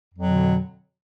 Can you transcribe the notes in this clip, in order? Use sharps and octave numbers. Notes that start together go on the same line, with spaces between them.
F2 B2 D3 F#3